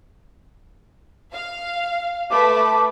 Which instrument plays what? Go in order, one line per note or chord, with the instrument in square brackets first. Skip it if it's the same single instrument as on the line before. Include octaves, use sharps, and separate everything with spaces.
[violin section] F5
[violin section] A3 B4 [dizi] D6